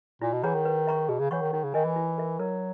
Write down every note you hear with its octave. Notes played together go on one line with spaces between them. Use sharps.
A#2 E4
B2
E3 G#4 C#5 F#5 A#5
D#3
B4
E5 A#5 C#6
B2 G#4
C#3
E3 C#5 F#5 C#6
D#3
D#3 D#4
C#3
D#3 A#4 D#5 G#5
E3
E4
A#4 E5
F#3 A#4